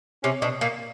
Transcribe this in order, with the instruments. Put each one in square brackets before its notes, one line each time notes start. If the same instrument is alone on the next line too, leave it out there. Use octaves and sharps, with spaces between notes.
[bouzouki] C3 [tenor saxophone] C#4
[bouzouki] B2 [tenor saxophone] D4
[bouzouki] A#2 [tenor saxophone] A#3